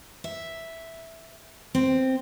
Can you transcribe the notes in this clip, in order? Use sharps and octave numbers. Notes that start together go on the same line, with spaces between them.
E5
C4